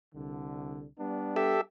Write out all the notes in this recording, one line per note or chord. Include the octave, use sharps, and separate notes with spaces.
C2 D3
G3 B3 D4
G4 A4 E5